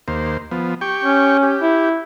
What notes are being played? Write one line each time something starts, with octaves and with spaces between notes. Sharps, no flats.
D#2 A#3 C5
F3 B3
G4 G5 C#6
C#4
G4
E4